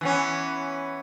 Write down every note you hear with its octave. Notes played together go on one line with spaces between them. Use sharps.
E3 B3 C#4